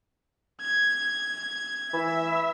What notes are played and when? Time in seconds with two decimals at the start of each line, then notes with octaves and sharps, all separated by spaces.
0.61 G#6
1.93 E3 E5